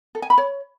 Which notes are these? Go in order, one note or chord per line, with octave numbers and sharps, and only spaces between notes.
A4
G#5
B5
C#5